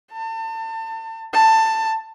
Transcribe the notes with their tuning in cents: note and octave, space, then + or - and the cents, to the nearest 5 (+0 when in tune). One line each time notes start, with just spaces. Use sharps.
A5 +35
A5 +15